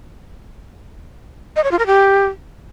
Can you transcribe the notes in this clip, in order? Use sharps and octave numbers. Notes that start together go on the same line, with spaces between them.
D#5
C#5
F4
A#4
G4